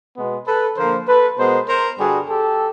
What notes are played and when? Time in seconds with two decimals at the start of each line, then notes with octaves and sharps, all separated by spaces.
0.16 B2 G#3 B3
0.46 A4 B4
0.77 D3 F3 A#3 A#4 C5
1.07 A4 B4
1.37 B2 G#3 B3 A#4 C5
1.67 A#4 C5
1.98 G2 D3 G3 F#4 G#4
2.28 G4 A4